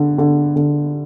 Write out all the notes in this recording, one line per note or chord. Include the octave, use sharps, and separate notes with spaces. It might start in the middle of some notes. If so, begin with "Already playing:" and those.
Already playing: D3
D3
D3